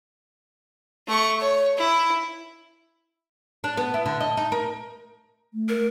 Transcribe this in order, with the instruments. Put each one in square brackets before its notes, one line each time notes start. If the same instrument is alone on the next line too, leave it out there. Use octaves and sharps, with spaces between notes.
[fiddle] A3 C#6
C#5
E4
[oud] D4
B3
E4
D3
D#5
D#4
A#4
[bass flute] A3
[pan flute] A#4